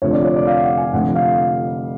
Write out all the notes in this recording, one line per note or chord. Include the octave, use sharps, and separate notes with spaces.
F1 F2 D3 F3 C#5
D5
C#5
D5
F5
F#5
G#5
F1 F2 D3 F3 F#5
F5